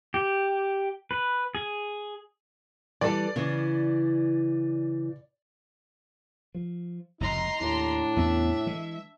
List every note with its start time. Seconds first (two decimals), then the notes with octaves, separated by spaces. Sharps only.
0.14 G4
1.11 B4
1.55 G#4
3.01 E3 G3 A4 D5
3.36 C#3 E3
6.55 F3
7.20 F1 C#2 D#4 A#5 C6
7.61 D#2 A2 D4
8.16 E2 B3 C#4 E5
8.66 E3 G#3